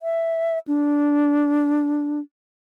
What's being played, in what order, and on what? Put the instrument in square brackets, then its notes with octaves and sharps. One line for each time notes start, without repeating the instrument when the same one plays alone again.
[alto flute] E5
D4